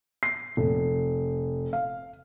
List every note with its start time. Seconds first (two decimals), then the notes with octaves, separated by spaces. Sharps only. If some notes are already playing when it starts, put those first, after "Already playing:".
0.23 C7
0.57 F1
1.73 F5